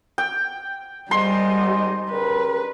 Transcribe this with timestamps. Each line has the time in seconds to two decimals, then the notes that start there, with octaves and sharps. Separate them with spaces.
0.18 G5
1.11 G#1 G#2 G3 D#5 C6
2.11 C#3 G3 A#4 B4